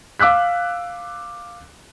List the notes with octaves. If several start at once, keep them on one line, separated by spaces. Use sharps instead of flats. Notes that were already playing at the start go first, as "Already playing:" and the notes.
F5 D6 E6 F#6 B6